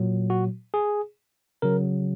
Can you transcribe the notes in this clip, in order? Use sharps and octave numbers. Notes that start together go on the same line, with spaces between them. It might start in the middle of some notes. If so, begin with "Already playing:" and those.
Already playing: A#2 F#3
F#4
G#4
C#3 F#3 A#4